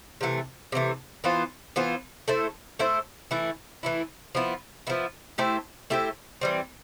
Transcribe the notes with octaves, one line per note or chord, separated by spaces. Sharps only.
C3 E3 A3
C3 E3 A3
E3 B3 F4 C5
E3 B3 F4 C5
A3 E4 A4 C5
A3 E4 A4 C5
E3 A3 E4
E3 A3 E4
F3 B3 E4
F3 B3 E4
A3 E4 G4 C5
A3 E4 G4 C5
E3 G3 C4